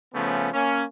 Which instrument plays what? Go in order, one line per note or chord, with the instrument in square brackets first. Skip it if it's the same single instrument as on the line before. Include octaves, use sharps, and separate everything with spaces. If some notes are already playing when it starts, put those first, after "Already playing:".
[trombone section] C#3 F3 A3 B3 C#4
A#3 C#4